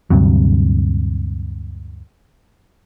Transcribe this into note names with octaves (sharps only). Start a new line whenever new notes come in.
D2 G2 C3 F#3